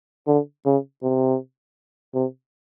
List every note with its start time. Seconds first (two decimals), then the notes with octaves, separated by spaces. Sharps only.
0.27 D3
0.66 C#3
1.03 C3
2.14 C3